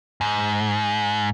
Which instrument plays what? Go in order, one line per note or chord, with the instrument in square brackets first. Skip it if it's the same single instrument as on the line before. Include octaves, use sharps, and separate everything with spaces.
[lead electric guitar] G#2